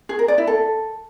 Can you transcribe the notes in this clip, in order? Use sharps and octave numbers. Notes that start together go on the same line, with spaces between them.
G#4
A#4
D5
E4
A4